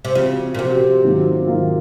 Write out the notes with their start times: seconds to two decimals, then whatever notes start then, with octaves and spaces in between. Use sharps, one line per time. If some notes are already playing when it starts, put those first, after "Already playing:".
0.05 C3
0.15 C#3 F3 C4 F#4
0.55 A#2
0.59 C3 F3 C4 F#4
1.03 G#2 D#3 F#3 A#3 F4
1.47 G#2 D#3 F#3 A#3 F4